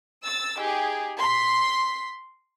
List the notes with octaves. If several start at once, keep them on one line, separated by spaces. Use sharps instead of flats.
E6 A6
D#4 G4 G#4
C6 B6